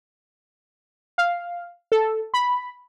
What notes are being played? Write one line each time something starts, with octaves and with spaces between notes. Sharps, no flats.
F5
A4
B5